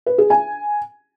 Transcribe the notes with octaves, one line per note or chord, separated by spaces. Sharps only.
B4
G#4
G#5